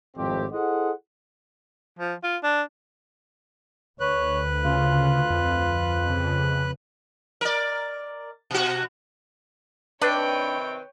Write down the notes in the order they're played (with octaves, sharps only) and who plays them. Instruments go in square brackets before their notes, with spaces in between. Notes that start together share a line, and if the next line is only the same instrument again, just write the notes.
[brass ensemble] G#1 F2 A2 C4 G4
E4 G#4 A4 C5 D#5 F#5
[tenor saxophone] F3
F4
D4
[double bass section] D2 [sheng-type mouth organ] B4 F#6 [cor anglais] C#5
[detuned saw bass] C#3 [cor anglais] F4
[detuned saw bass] F2
[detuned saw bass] F2 [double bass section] C#3
[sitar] A#4 D5
B2 F#4
[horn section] C3 D#3 C4 [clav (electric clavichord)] D4 [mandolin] B4 [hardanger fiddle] C#5 G5